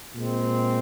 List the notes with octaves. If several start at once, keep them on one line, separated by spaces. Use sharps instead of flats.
A#2 G#3 C4